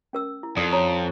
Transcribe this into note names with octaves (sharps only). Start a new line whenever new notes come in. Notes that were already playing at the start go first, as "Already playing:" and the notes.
C#4 A#4 E6
E4
F2 D5 D#6
C#5 A#5 D#6